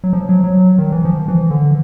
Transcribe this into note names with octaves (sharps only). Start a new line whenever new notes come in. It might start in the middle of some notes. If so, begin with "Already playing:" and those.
F#3
F3
F#3
F#3
D#3
E3
F3
E3
D3